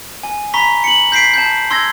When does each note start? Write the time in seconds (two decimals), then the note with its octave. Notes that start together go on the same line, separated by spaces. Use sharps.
0.23 G#5
0.54 A#5 B5 C#6 B6 G7
0.84 C#7 F#7
1.12 G6 B6 C7 D7
1.34 A5 G6
1.70 C6 E6 G#6 A#6